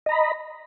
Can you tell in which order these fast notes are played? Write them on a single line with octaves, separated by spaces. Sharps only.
D#5 A#5 B5